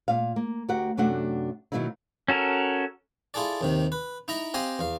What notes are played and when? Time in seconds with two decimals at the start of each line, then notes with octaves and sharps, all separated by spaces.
0.08 A#2 F4 F5
0.36 A#3
0.69 D2 F#4 G4 A#4 F#5
0.97 F#2 C3 A3 D4 F#4 F#5
1.72 B2 D#3 F#3 A#3 D#4 E4
2.28 C#4 F#4 A4 A#4
3.34 E4 F4 G#4 A4 D5
3.61 D#2 C3 D#3
3.92 B4
4.28 D#4 E4 E5 A#5
4.54 C4 G4 D#5 F5 G#5 C6
4.79 E2 F5